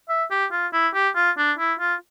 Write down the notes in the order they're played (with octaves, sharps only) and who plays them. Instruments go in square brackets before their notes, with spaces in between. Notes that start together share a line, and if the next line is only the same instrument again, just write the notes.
[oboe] E5
G4
F4
E4
G4
F4
D4
E4
F4